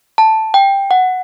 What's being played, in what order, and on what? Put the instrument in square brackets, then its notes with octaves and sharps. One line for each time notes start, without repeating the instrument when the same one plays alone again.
[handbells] A5
G5
F#5